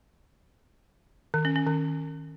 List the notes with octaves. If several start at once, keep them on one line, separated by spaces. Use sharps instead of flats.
D#3
C#4
C#4
D#3